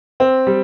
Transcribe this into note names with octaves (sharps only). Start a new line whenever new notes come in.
C4
G3